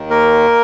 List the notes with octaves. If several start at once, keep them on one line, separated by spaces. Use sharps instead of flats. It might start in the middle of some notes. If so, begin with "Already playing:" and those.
Already playing: D#2 D#3
A#3 A#4